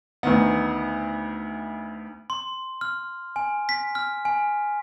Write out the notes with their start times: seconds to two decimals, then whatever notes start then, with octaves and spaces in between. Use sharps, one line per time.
0.23 D2 D#3 B3
2.30 C6
2.81 F6
3.36 G#5
3.69 B6
3.95 F6
4.25 G#5